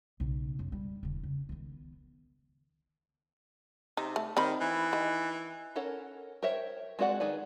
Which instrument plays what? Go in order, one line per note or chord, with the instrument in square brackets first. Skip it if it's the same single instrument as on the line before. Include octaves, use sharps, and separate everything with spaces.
[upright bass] B1 C#3
F#2
G3
E1 D3
C#3
D#3 B3
[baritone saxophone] C3 [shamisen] D#4
[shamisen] A3
[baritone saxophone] D#3 [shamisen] C4 D#4 B5
[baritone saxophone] E3
[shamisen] D#3
[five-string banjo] C#4 A4 A#4 C#5 F#5
A#4 C5 C#5 E5 G5
G#3 C4 F#4 D5 F#5
D#3 G#4 B4 D5